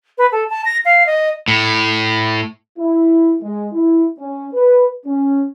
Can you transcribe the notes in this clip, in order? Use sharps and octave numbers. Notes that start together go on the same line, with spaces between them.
B4
A4
A5
A#6
F5
D#5
A2
E4
G#3
E4
C#4
B4
C#4